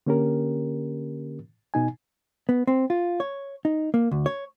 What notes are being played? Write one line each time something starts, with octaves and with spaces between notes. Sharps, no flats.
D3 A#3 C#4 G4 A#4
B2 D#4 G#5
B3
C4
F4
C#5
D#4
A#3
D2
C#5